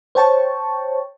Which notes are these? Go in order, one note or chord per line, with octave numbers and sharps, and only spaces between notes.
C5 C#5 G5 A5 C#6